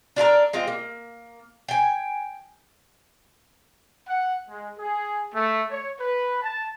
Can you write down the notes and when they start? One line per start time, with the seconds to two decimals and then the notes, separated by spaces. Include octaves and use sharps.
0.16 D4 F4 A4 A#4
0.53 G#3 C4 F4
0.68 A#3
1.68 G5 G#5
4.08 F#5
4.49 G#3
4.78 G#4
5.34 A3
5.70 C#5
6.00 B4
6.42 A5